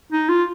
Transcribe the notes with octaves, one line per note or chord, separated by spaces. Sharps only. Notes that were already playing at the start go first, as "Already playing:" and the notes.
D#4
F4